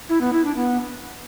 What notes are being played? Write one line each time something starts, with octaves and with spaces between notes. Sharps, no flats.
E4
B3
E4
D4
B3